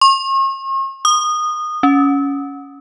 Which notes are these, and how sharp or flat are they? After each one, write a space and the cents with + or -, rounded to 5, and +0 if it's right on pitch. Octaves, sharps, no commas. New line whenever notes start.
C#6 -45
D#6 -20
C#4 +10